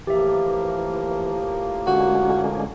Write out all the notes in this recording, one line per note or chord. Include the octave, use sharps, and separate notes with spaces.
A2 E3 F3 A#3 G4 E5
D3 G#3 C#4 F#4